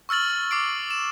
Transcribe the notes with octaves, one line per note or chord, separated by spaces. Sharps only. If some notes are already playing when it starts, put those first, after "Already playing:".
C#6 E6 F6 A6 F#7
D6 C7 D7
E7